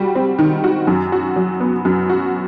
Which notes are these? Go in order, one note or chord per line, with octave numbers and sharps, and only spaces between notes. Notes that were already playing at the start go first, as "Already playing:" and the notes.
Already playing: G3 F#4
C4
D#3
F#4
F#2
F#4
F#3
B3
F#2
F#4